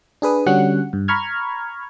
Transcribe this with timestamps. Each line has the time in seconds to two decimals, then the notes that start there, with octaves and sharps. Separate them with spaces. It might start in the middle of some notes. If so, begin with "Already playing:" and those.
0.22 D4 G#4 B4 D#6
0.46 D3 G3 C#4 F#4 F#5
0.93 G2
1.08 A#5 B5 C#6 F6 G#6